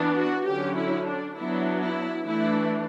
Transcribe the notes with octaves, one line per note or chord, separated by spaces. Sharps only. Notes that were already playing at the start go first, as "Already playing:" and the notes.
Already playing: E3 B3 D4
F#4
D3 F#3 C#4 G4
E4
D4
F#3 B3 D4 E4
E4
E3 A3 D4 E4